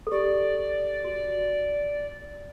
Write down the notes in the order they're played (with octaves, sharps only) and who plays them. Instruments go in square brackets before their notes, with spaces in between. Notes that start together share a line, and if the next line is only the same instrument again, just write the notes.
[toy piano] A4
[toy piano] G4 [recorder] D5
[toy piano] F#4